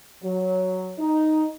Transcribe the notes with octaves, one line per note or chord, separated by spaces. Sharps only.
F#3
D#4